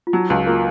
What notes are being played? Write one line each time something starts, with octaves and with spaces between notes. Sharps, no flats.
F4
F#3 D#4
C#2 D#4
A#3 F4